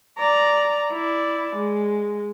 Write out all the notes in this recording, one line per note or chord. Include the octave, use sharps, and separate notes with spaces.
D5 A#5
E4 D5
G#3